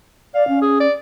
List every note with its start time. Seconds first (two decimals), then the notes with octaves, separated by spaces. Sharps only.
0.34 D5 F5
0.48 C#4
0.61 G#4
0.80 D5